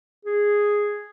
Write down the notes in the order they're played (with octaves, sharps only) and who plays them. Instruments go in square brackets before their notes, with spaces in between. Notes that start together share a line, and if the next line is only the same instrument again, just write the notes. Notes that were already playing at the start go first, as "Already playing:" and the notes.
[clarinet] G#4